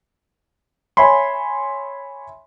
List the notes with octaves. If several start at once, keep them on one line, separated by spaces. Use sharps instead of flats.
C#5 E5 G#5 B5 C6